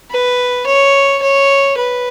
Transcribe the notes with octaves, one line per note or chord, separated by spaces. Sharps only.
B4
C#5
C#5
B4